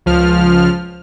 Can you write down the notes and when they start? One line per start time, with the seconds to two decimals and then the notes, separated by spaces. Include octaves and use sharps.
0.06 C#2 F3 F6